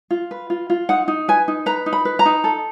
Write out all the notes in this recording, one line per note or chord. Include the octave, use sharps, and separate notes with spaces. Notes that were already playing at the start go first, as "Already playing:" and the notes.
F4
B4
F4
F4
D#4 F#5
D#4
B4 G#5
D#4
B4 A#5
D#4
B5
B4
A#5
D#4
A4